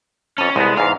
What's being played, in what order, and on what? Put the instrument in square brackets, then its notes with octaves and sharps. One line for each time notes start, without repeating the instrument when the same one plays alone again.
[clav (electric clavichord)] F2 A5 [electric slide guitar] C#4
[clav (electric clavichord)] C2 B3 [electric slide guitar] G#3
[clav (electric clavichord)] E2 G#2 [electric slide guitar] F5